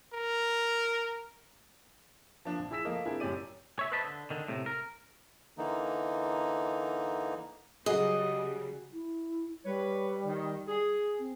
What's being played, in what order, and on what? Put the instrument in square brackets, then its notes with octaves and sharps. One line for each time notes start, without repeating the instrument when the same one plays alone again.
[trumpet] A#4
[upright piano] F3 A#3 D4 F4
A#1
E4 G#4 E6 B6 E7
F3 A3 A#3 A#4 D#5
C4 D4 E4 G#4 A#4
F#2 A2 C#4 G4 D5 D#7
[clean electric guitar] C#5 E5
B4 C5 D#5 E5 A5 B5
D3
D3 D#3
A2 C3
A#4
[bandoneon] D3 E3 A#3 D#4
[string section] C#3 F#3 G3 [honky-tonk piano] F#4 G#4 [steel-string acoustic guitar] D#5
[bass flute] E4
[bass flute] G3 [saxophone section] B4 C#5
[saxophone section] D#3
G#4
[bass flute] C4